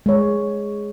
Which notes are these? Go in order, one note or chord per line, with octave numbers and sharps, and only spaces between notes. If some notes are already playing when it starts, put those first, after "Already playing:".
G#3 C#5